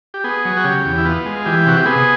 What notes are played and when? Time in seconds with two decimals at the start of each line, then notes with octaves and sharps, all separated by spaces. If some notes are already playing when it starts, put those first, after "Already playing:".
0.14 G4
0.24 B3 G#4
0.45 F#3
0.57 F#4
0.64 C#3 G4
0.85 E2
0.98 E4
1.05 B3 F4
1.26 G#3
1.46 E3 G4
1.66 C3 F#4
1.77 G4
1.86 B3 G#4